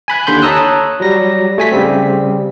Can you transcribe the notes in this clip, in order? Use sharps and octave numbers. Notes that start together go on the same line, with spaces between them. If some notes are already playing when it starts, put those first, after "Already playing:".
G#5 B5 F#6 G#6
D#2 D3 B5 C6 G6
C#5 A5 A#5 D#6 E6 F#6
F#3 G3 A#6
A3 G#5 B6
C#3 G3 C4